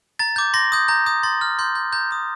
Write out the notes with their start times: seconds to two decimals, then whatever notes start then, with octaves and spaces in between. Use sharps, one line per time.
0.19 A#5 A6
0.36 D6 G6
0.54 C6 A#6
0.72 D#6 G6
0.88 A#5 G6
1.06 D#6 G6
1.23 C6 A6
1.41 F6
1.59 C6 G6
1.75 G6
1.93 A#5 G6
2.11 D#6 G6